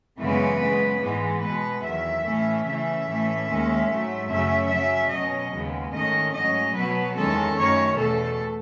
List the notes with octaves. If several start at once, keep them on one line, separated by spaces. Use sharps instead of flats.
F#2 C#3 E3 G#3 B3 B4
C#3 G#3 B3
G#2 E3 G#3 B3
B2 G#3 B3 B4
E2 D#3 F#3 E5
A2 E3 A3 C#4
C#3 E3 A3 C#4 E5
A2 E3 A3 C#4
D#2 D#3 G#3 C#4
G#2 F#3 A3
F#2 C#3 F#3 A3 C#4 E5
C#3 F#3 C#4 E5
B2 F#3 C#4 D#5
D#2 C#3 G#3 B3
G#2 D#3 A3 C#4 D#5
G#2 F#3 C#4 D#5
B2 F#3 B3 B4
E2 D#3 G#3 C#4 A4
F#2 D#3 A3 C#4 C#5
E2 B2 A3 A4